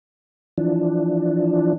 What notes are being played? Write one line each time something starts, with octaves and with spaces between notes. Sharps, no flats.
E3 F3 D4